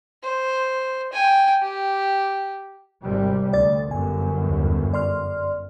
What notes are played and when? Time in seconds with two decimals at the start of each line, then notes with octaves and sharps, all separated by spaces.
0.23 C5
1.13 G5 G#5
1.62 G4
3.01 G#1 C3 G3
3.53 D2 D5 A6
3.91 G1 F#2 G#5
4.49 D#2
4.94 D5 C6 F6